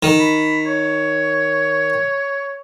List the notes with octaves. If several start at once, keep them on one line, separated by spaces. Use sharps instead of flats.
D#3
B5
C#5